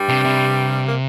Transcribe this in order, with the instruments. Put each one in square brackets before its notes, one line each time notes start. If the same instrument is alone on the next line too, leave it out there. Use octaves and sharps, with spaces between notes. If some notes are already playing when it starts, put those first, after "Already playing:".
Already playing: [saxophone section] G2 G3
[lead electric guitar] C3
C3
[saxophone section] A#3